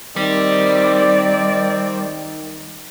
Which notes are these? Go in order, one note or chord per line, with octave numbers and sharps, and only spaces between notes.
D#3 G3 C4 D5